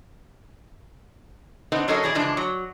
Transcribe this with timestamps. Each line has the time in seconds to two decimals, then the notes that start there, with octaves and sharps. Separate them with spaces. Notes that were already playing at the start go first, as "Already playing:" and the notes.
1.72 B3 C4 D4 D#4
1.88 F#3 C#4 D#4 A4 A#4 D#5
2.03 B2 E3 G#4 D5
2.15 C#3 E3 F3 G#3 D4
2.37 F#3